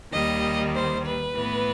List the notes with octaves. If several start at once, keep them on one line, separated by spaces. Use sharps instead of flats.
D#2 D#3 G3 D#5
C5
B4
A2 E3 B3